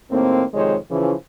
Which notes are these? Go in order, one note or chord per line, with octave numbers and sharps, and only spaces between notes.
D#2 A2 A#3 C4
F2 C3 D#3 G#3 C5 C#5
C#3 E3 F3